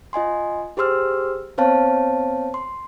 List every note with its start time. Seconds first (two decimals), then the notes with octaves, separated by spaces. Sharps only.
0.13 F4 D#5 G#5 C6
0.77 G4 G#4 C5 C6 E6 F6
1.58 B3 C4 C5 C#5 F5 A5
2.54 C6